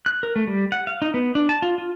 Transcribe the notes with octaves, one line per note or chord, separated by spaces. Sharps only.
F#6
A#4
A3
G3
F#5
F5
D#4
B3
D4
A5
F4
F4